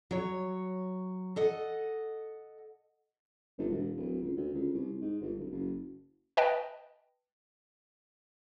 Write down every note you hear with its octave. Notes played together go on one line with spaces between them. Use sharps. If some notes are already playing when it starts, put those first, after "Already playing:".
F#3 C#5
A4 D#5 F#5
G1
E1
D1
C#2
D2
C#2
C2
G#2
G1
D1
F#1
B4 D#5 G5 A5